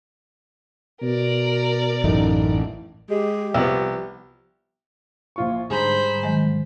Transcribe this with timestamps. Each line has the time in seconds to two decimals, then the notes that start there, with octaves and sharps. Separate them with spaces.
1.02 B2 A#4 D5
2.04 A1 F#2 A3 D#4
3.09 G#3 G4
3.54 C2 F3 B3
5.36 A#1 F4 C#6
5.70 G#2 D3 G3 G#4 C5 A#5 B5
6.23 D#3 F#3 G#3